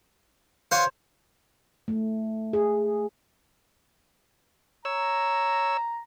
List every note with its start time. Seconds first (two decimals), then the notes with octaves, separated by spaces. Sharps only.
0.71 C5 C#5 F5 F#5 G#5
1.88 A3
2.53 G#4
4.85 C#5 A#5 E6